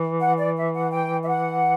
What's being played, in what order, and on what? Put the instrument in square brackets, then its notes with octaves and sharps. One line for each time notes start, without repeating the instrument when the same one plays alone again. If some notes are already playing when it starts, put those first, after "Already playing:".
Already playing: [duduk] E3
[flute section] F#5
D5
E5
F#5
G5
E5
F#5